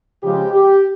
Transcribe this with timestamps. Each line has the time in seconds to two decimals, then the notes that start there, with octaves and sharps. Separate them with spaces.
0.22 C#3 F3 G#3 C#4 G4
0.52 G4